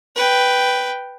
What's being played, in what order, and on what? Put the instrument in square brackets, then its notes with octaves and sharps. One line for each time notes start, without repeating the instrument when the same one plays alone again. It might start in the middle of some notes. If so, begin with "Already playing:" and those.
[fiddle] B4 G5